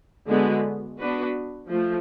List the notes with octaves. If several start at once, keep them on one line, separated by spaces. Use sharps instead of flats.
D3 G#3 B3 F#4
B3 D4 F#4 B4
F3 A3